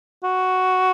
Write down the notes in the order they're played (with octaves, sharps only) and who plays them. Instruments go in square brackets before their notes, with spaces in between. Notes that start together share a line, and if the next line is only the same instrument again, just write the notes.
[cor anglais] F#4